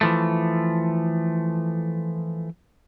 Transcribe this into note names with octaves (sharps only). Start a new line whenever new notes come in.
E3 F3 A3